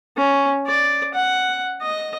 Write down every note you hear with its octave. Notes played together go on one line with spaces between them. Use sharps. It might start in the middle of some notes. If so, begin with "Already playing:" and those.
C#4
D5
F#5
D#5